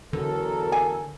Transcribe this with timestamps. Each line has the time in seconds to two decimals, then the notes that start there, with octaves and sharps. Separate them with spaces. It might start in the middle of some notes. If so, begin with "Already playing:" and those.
0.13 E2 D3 F#3 A4 A#4
0.72 G#5